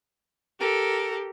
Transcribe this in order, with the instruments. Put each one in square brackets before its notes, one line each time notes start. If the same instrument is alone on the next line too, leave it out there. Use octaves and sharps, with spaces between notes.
[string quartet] G4 A4 A#4